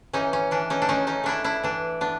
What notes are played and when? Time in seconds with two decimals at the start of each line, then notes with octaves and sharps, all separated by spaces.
0.13 E3 C#4 D#4
0.33 C#4
0.51 E3 D4
0.70 C#4 D#4
0.82 D4
0.89 A3 C#4 D#4
1.07 C#4 D#4
1.24 A3 D4 E4
1.44 D4 E4
1.63 E3 D4
2.01 B3 D4